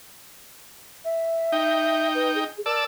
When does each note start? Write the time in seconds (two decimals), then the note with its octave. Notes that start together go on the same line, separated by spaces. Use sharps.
1.05 E5
1.52 D#4 G5
2.15 B4
2.35 G#4
2.66 A#4 D5 A5 E6